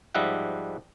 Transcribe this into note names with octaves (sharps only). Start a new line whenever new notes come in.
G#2 F3 G3 D#5 E5 F#5